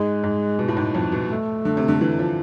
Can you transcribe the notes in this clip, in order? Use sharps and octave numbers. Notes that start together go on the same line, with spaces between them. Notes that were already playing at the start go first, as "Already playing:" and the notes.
Already playing: G#2 G#3
G#2
B2
A2
G#2
F2
B2
A3
D3
C3
D3
E3
F3